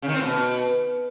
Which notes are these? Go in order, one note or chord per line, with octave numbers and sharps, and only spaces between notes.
C#3
D#3
C4
A2
B2